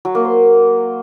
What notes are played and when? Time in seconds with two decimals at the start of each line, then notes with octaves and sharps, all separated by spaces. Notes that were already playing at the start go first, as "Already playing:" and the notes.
0.05 F#3
0.15 A#3
0.25 C5